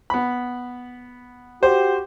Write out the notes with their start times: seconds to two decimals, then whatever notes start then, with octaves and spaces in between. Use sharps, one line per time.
0.10 B3 B5
1.63 F#4 G4 C5